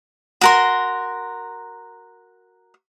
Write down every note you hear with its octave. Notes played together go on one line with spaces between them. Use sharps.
F#4 A#4 C6